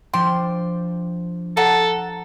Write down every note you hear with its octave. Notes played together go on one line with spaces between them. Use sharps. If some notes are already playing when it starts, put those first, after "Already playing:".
F3 D4 G5 C6
A4 F#5 A5 A#5